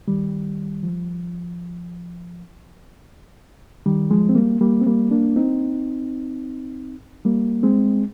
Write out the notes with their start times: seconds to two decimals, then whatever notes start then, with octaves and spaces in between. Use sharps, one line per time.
0.08 D#3 G3
0.83 F3
3.86 D#3 G3
4.11 F3 G#3
4.29 C4
4.35 G3 A#3
4.61 G3 A#3
4.81 C4
4.86 G3 A#3
5.11 A#3 D4
5.36 C4 D#4
7.25 G3 A#3
7.63 G#3 C4